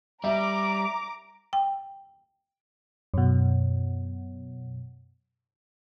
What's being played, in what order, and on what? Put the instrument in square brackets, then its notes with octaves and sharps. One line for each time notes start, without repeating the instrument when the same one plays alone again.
[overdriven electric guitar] G3 [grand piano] E5 [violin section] A#5 D6
[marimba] G5
[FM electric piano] F#2 B2